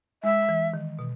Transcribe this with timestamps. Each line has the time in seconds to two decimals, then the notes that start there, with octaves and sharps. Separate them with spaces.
0.24 G#3 E5
0.49 E3
0.74 D#3
0.99 B2